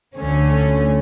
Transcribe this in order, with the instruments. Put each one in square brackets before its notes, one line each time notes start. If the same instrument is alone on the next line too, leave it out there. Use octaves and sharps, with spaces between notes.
[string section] D2 D3 A3 C#4